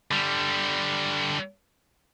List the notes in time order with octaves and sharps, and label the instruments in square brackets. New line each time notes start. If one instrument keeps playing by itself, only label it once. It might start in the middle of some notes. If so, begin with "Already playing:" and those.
[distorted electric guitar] D3 G3